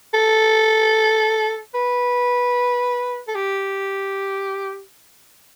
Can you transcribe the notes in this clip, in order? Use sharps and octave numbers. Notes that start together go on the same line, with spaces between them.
A4
B4
A4
G4